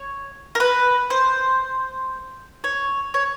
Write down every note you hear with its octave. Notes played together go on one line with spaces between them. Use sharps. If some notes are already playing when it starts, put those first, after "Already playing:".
Already playing: C#5
A#4
B4
C5
C#5
C#5